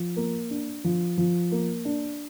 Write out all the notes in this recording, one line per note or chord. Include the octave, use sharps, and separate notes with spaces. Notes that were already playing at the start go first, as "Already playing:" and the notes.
Already playing: F3
A#3
D4
F3
F3
A#3
D4